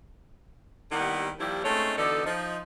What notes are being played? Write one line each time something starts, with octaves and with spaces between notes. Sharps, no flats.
D#2 D#3 G3 B3 E4 F#5
D#3 F3 G3 A#3 E4 G4
G#3 A3 C4 C#4 D#4 C#5
B2 D3 E3 D#4 A4 D5
F3 D#4